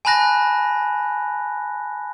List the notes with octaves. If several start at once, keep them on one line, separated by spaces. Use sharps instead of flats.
G#5 A5 B5 F#6 A#6